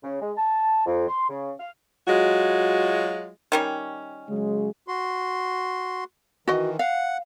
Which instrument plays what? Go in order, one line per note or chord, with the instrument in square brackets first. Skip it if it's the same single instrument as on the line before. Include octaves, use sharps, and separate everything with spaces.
[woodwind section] C#3
G#3
A5
F2
C6
C#3
F5
[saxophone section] F#3 G#3 F4 F#4
[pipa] D#3 G3 C#4
[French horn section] C#3 F#3 G#3
[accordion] F#4 C6
[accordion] D#3 E3 [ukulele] F#4 D#5
[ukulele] F5 [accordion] F#5